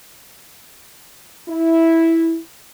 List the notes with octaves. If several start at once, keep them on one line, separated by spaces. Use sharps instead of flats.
E4